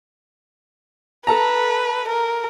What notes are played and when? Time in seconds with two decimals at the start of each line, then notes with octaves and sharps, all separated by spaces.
1.27 A4 B4 A5 A#5
2.08 A#4